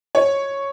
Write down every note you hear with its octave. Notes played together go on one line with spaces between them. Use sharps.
C#5